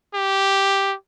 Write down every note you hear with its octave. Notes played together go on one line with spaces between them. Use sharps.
G4